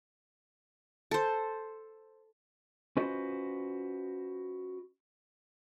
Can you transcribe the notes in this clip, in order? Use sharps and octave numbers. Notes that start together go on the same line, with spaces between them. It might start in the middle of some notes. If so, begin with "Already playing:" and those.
A4 C5
C#4 F4 F#4 B4 C5 D#5